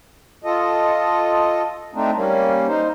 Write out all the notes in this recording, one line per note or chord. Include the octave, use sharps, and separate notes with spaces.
F4 A4 D#5
A3 C4 D4 D#4
G3 A#3 C#4
D#4 C5